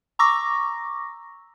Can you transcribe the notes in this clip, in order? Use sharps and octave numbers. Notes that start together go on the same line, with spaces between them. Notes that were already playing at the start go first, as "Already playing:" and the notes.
A#5 C#6 D6 E6 A#6